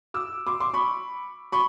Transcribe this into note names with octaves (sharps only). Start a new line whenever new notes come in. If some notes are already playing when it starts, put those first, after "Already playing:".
D6 E6
C6 D6
C6 D6
B5 C#6
B5 C#6